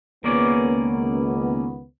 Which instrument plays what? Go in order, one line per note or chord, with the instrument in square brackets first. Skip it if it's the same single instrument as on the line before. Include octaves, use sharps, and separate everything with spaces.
[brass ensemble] C#2 D#3 B3 [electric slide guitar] A#3 C#4 D5